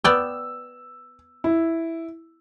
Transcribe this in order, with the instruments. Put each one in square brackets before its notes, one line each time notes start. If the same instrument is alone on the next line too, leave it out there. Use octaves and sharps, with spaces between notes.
[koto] B3 D5 G5 [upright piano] E6
[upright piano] E4